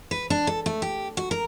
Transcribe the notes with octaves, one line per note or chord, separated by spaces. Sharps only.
B4
D4
A4
A3
G4
F#4
A#4